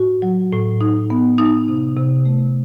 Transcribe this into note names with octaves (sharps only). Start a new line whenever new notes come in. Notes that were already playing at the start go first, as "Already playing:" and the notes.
Already playing: A2 F#4
F#3
A2
D#4
B3
D#4
C3
C3
A3